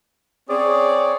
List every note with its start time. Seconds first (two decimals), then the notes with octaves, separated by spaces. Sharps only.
0.50 C4 C#4 G#4 C#5 D5